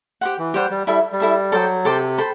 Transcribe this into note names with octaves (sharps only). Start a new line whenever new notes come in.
G4 C5 F#5
E3
G3 G4 C5 F#5
G3
G3 E4 A4 E5
G3
E4 A4 E5
F#3 A4 C5 G5 D6
C3 A4 C5 G5 D6
A4 C5 G5 B5